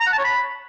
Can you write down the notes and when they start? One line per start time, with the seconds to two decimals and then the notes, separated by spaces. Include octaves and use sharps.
0.01 A#5
0.06 F#5
0.12 A5
0.18 C#5
0.24 B5